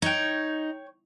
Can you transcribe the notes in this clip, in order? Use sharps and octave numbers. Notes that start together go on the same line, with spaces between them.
D#4 C#5 G5